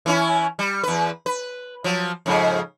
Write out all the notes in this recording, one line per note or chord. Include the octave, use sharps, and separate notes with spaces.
E3 C#4 E4
G3
E2 B4
B4
F3 F#3
F2 G#2 C#3